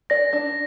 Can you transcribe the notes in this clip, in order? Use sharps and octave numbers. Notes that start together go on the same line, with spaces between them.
D5 A#6
D4